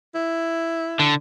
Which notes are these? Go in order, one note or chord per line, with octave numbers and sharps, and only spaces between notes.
E4
D3